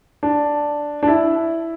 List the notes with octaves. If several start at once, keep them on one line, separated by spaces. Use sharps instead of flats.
D4
D4
E4